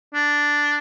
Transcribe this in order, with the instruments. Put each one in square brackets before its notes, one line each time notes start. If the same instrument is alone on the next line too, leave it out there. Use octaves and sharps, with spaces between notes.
[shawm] D4